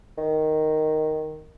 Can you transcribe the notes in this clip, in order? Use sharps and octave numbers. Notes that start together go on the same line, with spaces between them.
D#3